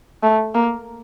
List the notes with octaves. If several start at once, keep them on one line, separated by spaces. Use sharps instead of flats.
A3
A#3